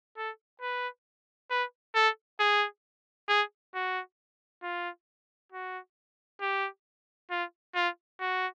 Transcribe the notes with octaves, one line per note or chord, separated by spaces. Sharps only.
A4
B4
B4
A4
G#4
G#4
F#4
F4
F#4
G4
F4
F4
F#4